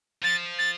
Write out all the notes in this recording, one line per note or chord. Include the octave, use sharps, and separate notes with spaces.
F3 A6
A6